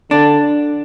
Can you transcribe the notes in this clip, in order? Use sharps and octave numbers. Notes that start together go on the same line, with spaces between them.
D3 D4